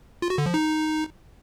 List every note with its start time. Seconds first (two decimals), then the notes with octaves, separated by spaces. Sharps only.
0.22 F4
0.30 F#4
0.38 D3
0.46 F3
0.54 D#4